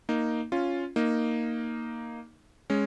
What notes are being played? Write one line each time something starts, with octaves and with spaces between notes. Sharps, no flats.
A#3 D#4
C#4 F4
A#3 D#4
G#3 C#4